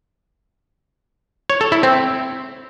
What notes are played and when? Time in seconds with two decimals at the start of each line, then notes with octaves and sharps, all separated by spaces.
1.50 C#5
1.61 A4
1.72 E4
1.83 C4